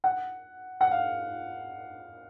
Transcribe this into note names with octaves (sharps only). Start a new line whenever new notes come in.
F#5
F#5
F5